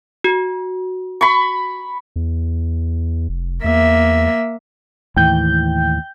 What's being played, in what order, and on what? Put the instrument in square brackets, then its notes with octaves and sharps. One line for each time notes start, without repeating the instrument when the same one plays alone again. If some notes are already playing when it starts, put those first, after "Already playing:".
[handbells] F#4
[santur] B5 C#6
[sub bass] E2
F1
[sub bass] E2 [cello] A#3 E5
[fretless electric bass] D#2 A2 E3 [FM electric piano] G5 G6